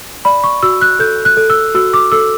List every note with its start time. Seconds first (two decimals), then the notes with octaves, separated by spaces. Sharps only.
0.25 D5 B5
0.44 C#6
0.63 F#4 E6
0.82 F#6
0.99 A4 G6
1.25 F#6
1.37 A4
1.50 E6
1.75 F#4 E6
1.93 D6
2.12 A4 E6